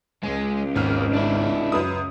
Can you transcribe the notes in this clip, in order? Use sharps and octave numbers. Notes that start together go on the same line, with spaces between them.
C#2 G#3
G#1 D#2 D#3 F6
D4 E4
F#2 B4 D#6